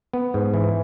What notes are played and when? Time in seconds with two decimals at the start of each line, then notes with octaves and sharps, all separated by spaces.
0.13 B3
0.34 G#2
0.54 E3